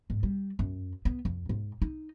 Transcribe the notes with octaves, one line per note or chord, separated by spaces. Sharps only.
G#2
G3
F#2
B3
F2
G#2
D#4